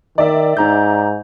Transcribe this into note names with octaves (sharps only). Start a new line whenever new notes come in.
D#3 D5 E5
G#2 D#4 A#5 G6